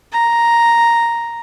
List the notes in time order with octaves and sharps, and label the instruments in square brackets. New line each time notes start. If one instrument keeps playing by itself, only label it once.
[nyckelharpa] A#5